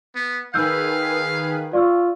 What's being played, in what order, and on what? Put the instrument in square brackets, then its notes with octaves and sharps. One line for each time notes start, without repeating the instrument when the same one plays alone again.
[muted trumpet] B3
[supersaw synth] D#3 G#4 B4 [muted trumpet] F5 [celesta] E6 G6
[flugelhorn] F4 [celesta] D5 C#6 E6